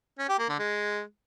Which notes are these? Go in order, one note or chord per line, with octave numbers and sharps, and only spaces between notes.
C#4
G4
A#3
D3
G#3